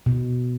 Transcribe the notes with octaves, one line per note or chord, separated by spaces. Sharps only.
B2